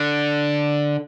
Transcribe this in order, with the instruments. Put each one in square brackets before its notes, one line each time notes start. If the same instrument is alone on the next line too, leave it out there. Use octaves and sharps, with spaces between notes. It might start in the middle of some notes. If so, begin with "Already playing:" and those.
Already playing: [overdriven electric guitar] D3